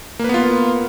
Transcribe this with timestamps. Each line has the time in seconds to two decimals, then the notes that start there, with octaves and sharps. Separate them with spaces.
0.19 A#3
0.24 B4
0.29 B3
0.34 F4